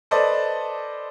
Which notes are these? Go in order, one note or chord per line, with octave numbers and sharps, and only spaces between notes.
A4 B4 C5 D5 D#5